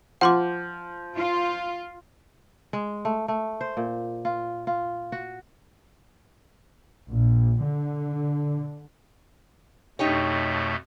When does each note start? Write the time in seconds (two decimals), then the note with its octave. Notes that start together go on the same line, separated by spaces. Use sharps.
0.21 F3 F#5 C6 D6
1.17 F4
2.73 G#3
3.05 A3
3.28 A3
3.61 C5
3.77 A#2
4.25 F4
4.67 F4
5.12 F#4
7.08 A#1
7.63 D3
9.99 F2 B2 A3 D#4 G4 C#5